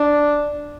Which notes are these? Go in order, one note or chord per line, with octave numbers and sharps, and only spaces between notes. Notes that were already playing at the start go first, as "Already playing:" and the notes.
Already playing: D4